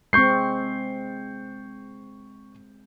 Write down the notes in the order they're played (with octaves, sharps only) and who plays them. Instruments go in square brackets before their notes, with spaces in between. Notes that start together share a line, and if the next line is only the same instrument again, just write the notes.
[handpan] G#3 C4 [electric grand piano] C#6 G6 C7